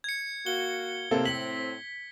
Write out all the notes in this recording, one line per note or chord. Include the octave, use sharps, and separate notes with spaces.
G#6 C#7
A#3 F#4 G7
A2 C3 A#3 C4 A4
B6 F#7